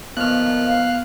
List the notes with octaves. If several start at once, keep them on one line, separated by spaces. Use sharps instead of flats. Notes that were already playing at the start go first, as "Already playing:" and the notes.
A#2 D#3 F3 B3 F6 F#6
F5